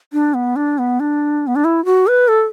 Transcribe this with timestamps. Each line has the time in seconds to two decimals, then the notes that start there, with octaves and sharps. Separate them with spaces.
0.13 D4
0.34 B3
0.56 D4
0.78 B3
1.00 D4
1.47 B3
1.56 D4
1.64 E4
1.85 F#4
2.07 B4
2.28 A4